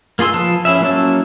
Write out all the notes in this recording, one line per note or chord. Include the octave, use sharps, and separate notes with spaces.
A#3 F4 G#4 C6 E6
F3 B4 F5 A5 D#6
C#4 E4 G#4 E5
F#3 A#3 C#4 E4 A5